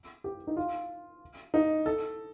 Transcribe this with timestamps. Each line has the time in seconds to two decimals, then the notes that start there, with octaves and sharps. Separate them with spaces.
0.24 G4
0.47 D#4
0.56 F4
1.54 D#4
1.86 A4